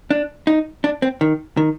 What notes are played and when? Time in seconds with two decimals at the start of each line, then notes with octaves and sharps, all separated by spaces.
0.11 D4
0.47 D#4
0.84 D4
1.02 C4
1.21 D#3
1.57 D#3